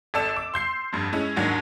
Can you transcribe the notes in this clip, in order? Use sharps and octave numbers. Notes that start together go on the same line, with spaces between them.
G#1 A4 D5 E6 E7
D6
C6 G6 C7
F1 G2
G#3 C#4 E4
D#2 G#2 D#3 F#3 D4